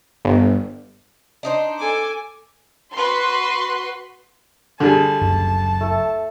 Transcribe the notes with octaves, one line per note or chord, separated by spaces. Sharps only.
G1
D4 D#4 C5
A4 G#5 D6
F#4 B4 C6
D3 G3 G#4 A5
F#1 C#2 F#2
A3 A4